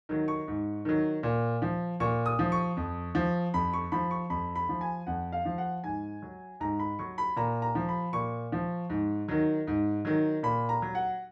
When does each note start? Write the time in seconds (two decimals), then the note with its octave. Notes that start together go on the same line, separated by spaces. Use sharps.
0.09 D#3 F#3
0.28 C#6
0.48 G#2
0.85 D#3 F#3
1.23 A#2
1.62 F3
2.00 A#2 C#6
2.26 D#6
2.39 F3
2.52 C#6
2.77 F2
3.15 F3
3.54 F2 B5
3.73 C#6
3.92 F3 B5
4.11 C#6
4.30 F2 B5
4.55 B5
4.69 F3
4.81 G#5
5.07 F2 F#5
5.32 F5
5.45 F3
5.58 F#5
5.84 G#2 G#5
6.22 F#3
6.60 G#2 A#5
6.79 B5
6.99 F#3 C#6
7.18 B5
7.36 A#2 A#5
7.62 A#5
7.75 F3
7.89 B5
8.13 A#2 C#6
8.52 F3
8.90 G#2
9.28 D#3 F#3
9.67 G#2
10.05 D#3 F#3
10.43 A#2 B5
10.69 A#5
10.82 F#3
10.95 F#5